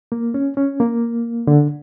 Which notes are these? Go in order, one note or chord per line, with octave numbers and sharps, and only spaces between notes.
A#3
C#4
C#4
A#3
D3